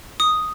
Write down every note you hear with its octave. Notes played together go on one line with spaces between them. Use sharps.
D#6